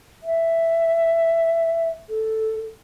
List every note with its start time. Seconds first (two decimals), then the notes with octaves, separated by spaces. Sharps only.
0.23 E5
2.09 A4